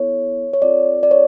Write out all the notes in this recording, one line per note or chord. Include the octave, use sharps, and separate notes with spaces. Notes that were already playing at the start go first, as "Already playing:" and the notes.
Already playing: B3 E4 A4 C#5
C#5
C4 F4 A4 D5
D5
C#5